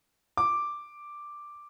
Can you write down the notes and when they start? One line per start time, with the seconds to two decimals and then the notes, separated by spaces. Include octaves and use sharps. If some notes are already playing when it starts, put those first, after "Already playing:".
0.37 D6